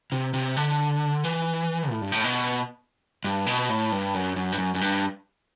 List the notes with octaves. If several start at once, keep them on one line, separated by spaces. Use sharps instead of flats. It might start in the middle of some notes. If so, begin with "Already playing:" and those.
C3
C3
D3
E3
A2
G2
A2
B2
G2
B2
A2
G2
F#2
F#2
G2
F#2
F#2
G2